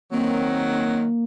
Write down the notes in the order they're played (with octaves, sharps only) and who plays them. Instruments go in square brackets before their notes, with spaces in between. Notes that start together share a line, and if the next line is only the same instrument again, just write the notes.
[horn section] D#3 F#3 [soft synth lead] A#3 [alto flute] C4